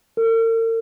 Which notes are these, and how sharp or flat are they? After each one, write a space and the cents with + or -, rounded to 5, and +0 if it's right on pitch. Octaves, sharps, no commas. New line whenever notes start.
A#4 -45